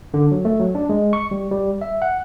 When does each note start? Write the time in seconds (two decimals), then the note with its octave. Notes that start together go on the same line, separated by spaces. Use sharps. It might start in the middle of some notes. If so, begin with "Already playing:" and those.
0.14 D3
0.32 F#3
0.45 A3
0.60 F#3
0.75 D4
0.89 G#3
1.13 C#6
1.31 G3
1.51 G3
1.81 E5
2.02 F#5